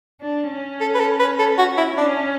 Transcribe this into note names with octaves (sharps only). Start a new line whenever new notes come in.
D4
C#4
A4
B4
A4
B4
A4
F#4
E4
C#4 D4